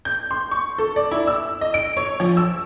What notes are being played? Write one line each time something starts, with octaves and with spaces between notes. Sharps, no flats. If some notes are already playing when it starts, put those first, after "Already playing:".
G6
C6
C#6
A4
D5
E4
E6
D#5
D7
C#5
F3
E6